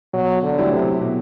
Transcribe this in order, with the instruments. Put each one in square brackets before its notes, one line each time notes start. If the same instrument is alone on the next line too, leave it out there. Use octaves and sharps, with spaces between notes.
[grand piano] B2 [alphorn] F#3
[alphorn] D3
[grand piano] F#3 A3 E4 G4
[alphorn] C3
[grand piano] B2